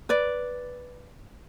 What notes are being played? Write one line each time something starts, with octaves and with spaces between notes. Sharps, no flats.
B4 D5